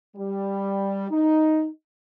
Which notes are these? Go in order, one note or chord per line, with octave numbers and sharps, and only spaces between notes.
G3
D#4